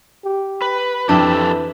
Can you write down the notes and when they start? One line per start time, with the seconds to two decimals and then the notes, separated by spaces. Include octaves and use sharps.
0.25 G4
0.62 B4
1.09 F2 E3 D4 G4 A4 E5